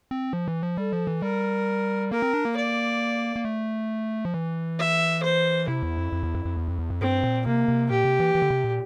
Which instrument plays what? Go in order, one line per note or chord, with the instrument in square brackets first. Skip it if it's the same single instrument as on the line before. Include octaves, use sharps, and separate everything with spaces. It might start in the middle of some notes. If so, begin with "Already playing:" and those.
[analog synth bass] C4
F3
E3
F3
[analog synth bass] G3 [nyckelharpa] A4
[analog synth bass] F3
E3
[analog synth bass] G3 [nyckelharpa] A#4
[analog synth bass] A#3 [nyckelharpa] A#4
[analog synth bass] C4
D4
A#3
[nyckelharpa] D5
[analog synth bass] A#3
A3
F3
E3
[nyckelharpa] E5
C5
[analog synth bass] C3 [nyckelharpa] E4
[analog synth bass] E2
F2
F2
E2
F2
F2
E2
F2
E2
F2
[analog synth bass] G2 [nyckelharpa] C4
[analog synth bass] A#2
[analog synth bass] C3 [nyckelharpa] A#3
[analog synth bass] C3
[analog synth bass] A#2 [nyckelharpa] G4
[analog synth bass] C3
E3
E3
D3
C3
A#2